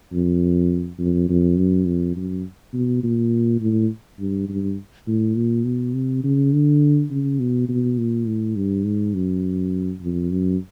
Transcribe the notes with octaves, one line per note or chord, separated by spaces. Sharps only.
F2
F2
F2
F#2
F2
F#2
B2
A#2
A2
G2
G2
A2
A#2
B2
C3
C#3
D3
C#3
B2
B2
A#2
A2
G2
G#2
F#2
F2
F#2